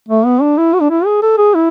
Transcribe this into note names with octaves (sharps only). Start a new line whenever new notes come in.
A3
B3
D4
E4
F#4
D4
E4
G#4
A4
G#4
E4